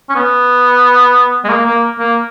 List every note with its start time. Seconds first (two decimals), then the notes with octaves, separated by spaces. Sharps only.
0.10 C#4
0.16 B3
1.44 G#3
1.49 A#3
1.66 A#3
1.99 A#3